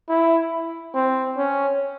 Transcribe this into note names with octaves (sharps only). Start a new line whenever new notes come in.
E4
C4
C#4